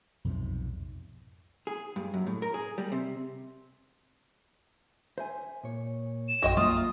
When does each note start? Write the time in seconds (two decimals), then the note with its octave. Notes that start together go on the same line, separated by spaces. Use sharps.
0.25 B1 F2 G#2 C3
1.67 G#4
1.96 G2
2.14 F#2
2.26 A2
2.42 A#4
2.54 G#4
2.78 G3
2.92 C3
5.18 C5 E5 G#5
5.64 A#2 C#5
6.29 E7
6.42 A#1 F#2 F#4 D#5 G5 C6
6.57 F#2 F#3 A#3 F4 E5 D#6 F6